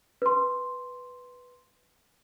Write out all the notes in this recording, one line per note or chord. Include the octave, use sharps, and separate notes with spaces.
B4 C6